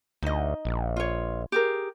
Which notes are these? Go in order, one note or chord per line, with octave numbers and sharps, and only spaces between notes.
D2 D#4 D#5
A#1
F4 C#5
G4 G#4 A#4